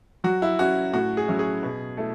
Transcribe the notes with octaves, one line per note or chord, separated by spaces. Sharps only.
F#3 F#4
E4
C#4 E4 F#4
A2 F#4
G#4
F#3 C#4 E4
G#4
B2
A3 E4